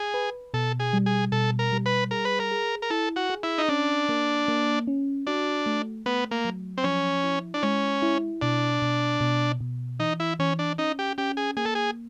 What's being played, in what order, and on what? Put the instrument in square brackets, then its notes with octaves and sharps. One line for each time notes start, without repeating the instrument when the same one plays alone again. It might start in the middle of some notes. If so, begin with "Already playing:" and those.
Already playing: [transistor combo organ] G#4
[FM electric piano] B4
[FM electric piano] B2 [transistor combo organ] A4
[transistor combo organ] G#4
[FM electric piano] G3
[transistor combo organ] G#4
[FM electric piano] B2 [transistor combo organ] A4
[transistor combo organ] A#4
[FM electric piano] G3
[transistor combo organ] B4
[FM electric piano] G#4 [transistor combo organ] A#4
[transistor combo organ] B4
A#4
[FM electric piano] G#4
[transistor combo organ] A#4
[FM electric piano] E4 [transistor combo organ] A4
[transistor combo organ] F#4
[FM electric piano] G#4
[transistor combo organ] E4
D#4
[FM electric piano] C#4 [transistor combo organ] D4
[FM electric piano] A#3
A#3
C#4
[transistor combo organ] D4 [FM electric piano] F#4
[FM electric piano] A3
[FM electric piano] A3 [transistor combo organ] B3
[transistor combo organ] A#3
[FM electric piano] F#3
[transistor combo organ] C4
[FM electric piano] F3 [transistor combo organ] C#4
[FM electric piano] E4
[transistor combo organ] D4
[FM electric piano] G#3 [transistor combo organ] C#4
[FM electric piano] E4
[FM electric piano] B2 [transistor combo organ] D4
[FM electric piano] B2
B2
B2
[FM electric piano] E3 [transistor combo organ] D#4
[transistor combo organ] E4
[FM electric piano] E3 [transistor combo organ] C#4
[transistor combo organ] D4
[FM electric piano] C#4 [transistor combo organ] D#4
[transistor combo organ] G4
[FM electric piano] C#4 [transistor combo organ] G4
[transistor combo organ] G#4
[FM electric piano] A#3 [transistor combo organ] G#4
[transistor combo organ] A4
G#4